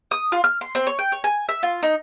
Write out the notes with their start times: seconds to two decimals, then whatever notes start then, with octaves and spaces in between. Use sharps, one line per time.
0.11 D#6
0.32 F4
0.44 F6
0.61 C6
0.75 C4
0.87 C#5
0.99 G5
1.12 C#5
1.24 G#5
1.49 E5
1.63 F4
1.83 D#4